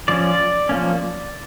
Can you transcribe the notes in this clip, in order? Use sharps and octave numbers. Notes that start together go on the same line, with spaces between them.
F3 C#4 D5
F3 A#3 C#4